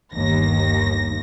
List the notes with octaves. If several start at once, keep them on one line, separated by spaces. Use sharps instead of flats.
G1 D#2 A#6